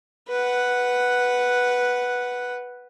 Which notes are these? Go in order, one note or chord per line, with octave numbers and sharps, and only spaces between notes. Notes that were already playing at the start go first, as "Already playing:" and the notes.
B4 F#5